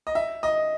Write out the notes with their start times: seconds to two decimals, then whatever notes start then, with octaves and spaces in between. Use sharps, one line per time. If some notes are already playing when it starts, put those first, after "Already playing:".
0.07 D#5
0.15 E5
0.43 D#5